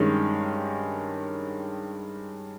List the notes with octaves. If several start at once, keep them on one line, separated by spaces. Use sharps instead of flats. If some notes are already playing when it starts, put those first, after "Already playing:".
Already playing: G2 D#3 G#3 C#4